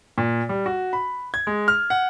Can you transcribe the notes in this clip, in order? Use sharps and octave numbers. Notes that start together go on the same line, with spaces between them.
A#2
G3
F#4
B5
G#6
G#3
F6
F#5